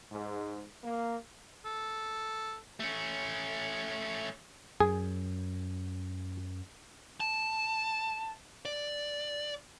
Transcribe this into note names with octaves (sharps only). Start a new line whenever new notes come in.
G#2
A#3
A4
A3 C#4
F#2 G#4
A5
D5